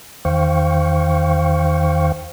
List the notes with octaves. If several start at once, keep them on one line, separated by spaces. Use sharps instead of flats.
E2 D#3 C5 F5 G5 C#6